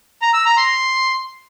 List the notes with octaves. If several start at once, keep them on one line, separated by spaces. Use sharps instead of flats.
A#5
E6
A#5
C6